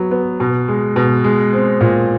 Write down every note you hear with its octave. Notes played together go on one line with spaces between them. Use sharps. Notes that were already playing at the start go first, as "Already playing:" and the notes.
Already playing: F#3 B3
B3
B2
G#3
B2
G#3
C4
A#2